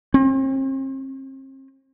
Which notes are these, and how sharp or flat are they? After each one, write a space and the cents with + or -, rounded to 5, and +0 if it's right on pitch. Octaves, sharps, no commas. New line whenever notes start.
C4 +40